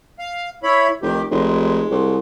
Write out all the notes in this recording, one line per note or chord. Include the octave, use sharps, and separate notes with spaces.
F5
E4 C#5 B5
F1 D#3 G4
F1 G#3
C2